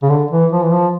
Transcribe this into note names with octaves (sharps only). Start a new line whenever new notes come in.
C#3
D3
E3
F3
E3
F3